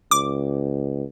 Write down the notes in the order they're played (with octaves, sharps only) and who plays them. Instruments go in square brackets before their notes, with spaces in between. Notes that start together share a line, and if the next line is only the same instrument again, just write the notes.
[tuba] C#2 [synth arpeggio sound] D6